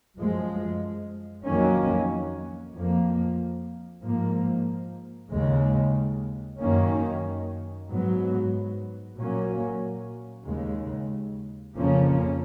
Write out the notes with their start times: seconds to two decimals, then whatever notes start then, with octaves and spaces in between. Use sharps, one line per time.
0.17 F#2 F3 G#3
1.45 F2 D#3 F#3 A#3 C#4
2.74 F2 F3 A#3
4.02 G#2 F3 A#3
5.31 D#2 C#3 G#3
6.59 F#2 D#3 A#3 C#4
7.88 G#2 F#3 B3
9.17 A#2 F#3 A#3 C#4
10.45 D#2 C#3 G#3
11.74 F2 C#3 F3 A#3 C#4